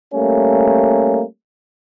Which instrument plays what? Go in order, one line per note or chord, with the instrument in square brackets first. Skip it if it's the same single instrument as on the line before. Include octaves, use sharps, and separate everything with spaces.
[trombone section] G3 A3 A#3 C#4